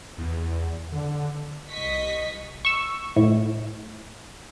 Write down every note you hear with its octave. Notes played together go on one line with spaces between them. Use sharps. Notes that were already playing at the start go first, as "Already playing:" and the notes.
E2
D3
C2 D#5 C#6 B6
C#6 E6
A2